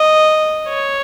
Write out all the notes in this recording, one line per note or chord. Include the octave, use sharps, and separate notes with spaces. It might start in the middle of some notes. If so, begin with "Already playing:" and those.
Already playing: D#5
C#5